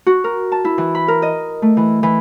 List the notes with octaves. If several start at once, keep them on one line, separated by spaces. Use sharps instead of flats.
F#4
A#4
A5
E4
E3
B5
A#4
D#5
A3
E3
E3